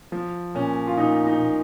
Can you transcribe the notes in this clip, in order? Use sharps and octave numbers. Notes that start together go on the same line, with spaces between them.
F3
A#2 C#4
F4
A#2 D#4
D#4
A#2